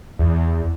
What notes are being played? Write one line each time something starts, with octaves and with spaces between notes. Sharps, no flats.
E2